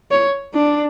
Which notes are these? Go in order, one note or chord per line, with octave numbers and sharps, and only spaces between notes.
C#5
D4